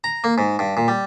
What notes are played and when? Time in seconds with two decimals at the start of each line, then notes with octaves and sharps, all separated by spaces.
0.04 A#5
0.24 A#3
0.38 G#2
0.59 G2
0.77 A#2
0.88 G3